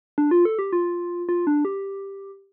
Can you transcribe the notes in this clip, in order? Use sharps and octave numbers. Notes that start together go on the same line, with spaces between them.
D4
F4
A4
G4
F4
F4
D4
G4